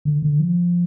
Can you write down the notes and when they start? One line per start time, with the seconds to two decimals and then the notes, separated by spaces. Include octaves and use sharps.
0.05 D3
0.22 D3
0.40 F3